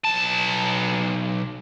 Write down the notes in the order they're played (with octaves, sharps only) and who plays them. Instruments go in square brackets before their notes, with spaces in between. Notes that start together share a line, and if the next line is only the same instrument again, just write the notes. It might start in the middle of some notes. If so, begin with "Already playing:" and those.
[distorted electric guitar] B1 A5